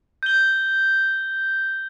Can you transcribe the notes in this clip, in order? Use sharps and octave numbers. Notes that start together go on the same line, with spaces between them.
G6 G7